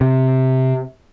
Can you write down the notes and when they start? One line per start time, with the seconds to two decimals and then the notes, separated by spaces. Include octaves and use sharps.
0.01 C3